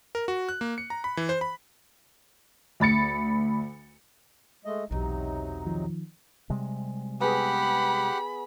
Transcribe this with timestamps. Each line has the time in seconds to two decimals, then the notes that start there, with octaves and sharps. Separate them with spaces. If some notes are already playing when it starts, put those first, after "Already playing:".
0.15 A#4
0.28 F#4
0.49 F#6
0.61 A#3
0.78 C#7
0.90 A#5
1.04 B5
1.17 E3
1.29 C5
1.41 B5
2.80 D2 B5 A6 C#7
4.65 G#3 A3 D#5
4.91 B1 E2 C3 F#3 D#4
5.67 D#3 F3
6.50 C3 G3 G#3
7.21 B3 G4 G#4 B4 F#5 B5